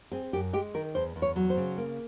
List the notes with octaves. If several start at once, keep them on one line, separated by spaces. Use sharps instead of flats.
C4 G#4
F#2 G4
G#3 G4
D#3 A#4
E2 C5
E2
C#5
F#3
C5
C#3
A#3